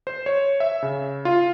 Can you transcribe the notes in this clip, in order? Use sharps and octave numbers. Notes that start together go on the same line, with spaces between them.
C5
C#5
E5
C#3
F4